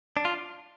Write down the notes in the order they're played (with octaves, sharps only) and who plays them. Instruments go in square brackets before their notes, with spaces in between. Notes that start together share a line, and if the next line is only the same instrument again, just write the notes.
[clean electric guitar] D4
F4